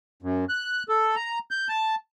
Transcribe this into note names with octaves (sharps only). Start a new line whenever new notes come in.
F#2
F#6
A4
A#5
G6
A5